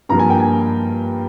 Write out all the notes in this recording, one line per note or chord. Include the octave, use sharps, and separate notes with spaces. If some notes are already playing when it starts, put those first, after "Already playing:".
G2 F3 A#3 A#5
G#5
G5
G#5